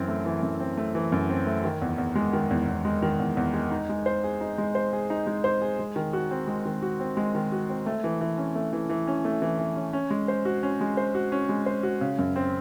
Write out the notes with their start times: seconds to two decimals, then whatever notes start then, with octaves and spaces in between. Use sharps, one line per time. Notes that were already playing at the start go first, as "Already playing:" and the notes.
Already playing: F#2 E3 C4
0.08 A3
0.25 E3
0.43 F#2
0.60 C4
0.77 A3
0.95 E3
1.12 F#2
1.30 C4
1.46 A3
1.64 D#3
1.82 E2
1.98 E2
2.15 G#3
2.33 D#3
2.51 E2
2.68 E2
2.85 G#3
3.02 D#3
3.19 E2
3.37 E2
3.54 G#3
3.71 D#4
3.89 G#3
4.06 C5
4.24 G#4
4.41 D#4
4.58 G#3
4.75 C5
4.93 G#4
5.10 D#4
5.27 G#3
5.44 C5
5.62 G#4
5.79 G#3
5.96 D#3
6.13 F#4
6.31 C4
6.47 G#3
6.65 D#3
6.82 F#4
7.00 C4
7.17 G#3
7.35 D#3
7.52 F#4
7.69 C4
7.86 A3
8.04 E3
8.21 E3
8.38 C#4
8.55 A3
8.73 E3
8.89 E3
9.07 C#4
9.25 A3
9.42 E3
9.59 E3
9.76 C#4
9.93 C#4
10.10 G#3
10.28 C5
10.45 F#4
10.63 C#4
10.81 G#3
10.97 C5
11.15 F#4
11.32 C#4
11.49 G#3
11.66 C5
11.83 F#4
12.01 C#3
12.19 F#2
12.36 C4